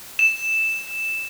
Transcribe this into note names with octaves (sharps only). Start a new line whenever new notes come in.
E7